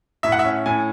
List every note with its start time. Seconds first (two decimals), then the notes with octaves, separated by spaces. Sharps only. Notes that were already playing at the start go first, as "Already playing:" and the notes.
0.23 A2 E5
0.32 F#5
0.39 E5
0.45 C#4
0.66 A2 G#5